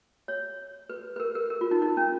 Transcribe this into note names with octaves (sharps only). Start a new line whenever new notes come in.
C#5
B4
B4
A#4
A#4
A#4
F4
D#4
D#4
C#4